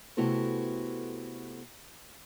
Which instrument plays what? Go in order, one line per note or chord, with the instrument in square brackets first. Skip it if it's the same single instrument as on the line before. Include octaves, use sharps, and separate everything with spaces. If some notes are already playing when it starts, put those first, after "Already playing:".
[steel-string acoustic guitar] C3 A3 B3 E4 F#4 A4